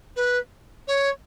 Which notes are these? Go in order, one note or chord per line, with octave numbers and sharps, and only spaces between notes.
B4
C#5